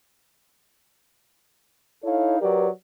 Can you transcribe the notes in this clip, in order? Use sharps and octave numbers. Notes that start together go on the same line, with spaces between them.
D#4 E4 A4 C#5 F5
F#3 G4 A#4 B4 D5